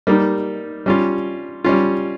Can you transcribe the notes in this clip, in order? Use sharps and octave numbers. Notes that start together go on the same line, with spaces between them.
G3 A#3 D#4
G3 C#4 F4
G3 C#4 F4